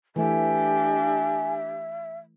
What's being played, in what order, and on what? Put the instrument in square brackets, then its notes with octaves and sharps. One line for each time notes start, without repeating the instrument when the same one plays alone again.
[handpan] E3 A3 [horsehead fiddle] D4 G4 [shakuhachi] E5 [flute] G#5